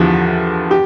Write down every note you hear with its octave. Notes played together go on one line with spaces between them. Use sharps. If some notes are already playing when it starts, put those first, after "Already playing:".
Already playing: E2 D3 F3 E4 G4
G4